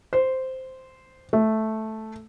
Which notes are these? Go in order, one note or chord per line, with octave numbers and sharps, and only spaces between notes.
C5
A3